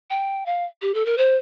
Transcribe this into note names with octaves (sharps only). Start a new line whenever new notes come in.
G5
F5
G4
A4
A#4
C5